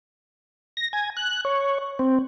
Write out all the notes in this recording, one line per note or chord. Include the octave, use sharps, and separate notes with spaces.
A#6
G#5
F#6
C#5
C4